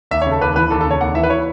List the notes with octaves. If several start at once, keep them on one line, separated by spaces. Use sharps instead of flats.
D#2 E5
C#3 C#5
A4
D#2 B4
E3 B4
D#2 A4
C#3 A4
C#5
D#2 F#5
E3 E5
B4
E4 C#5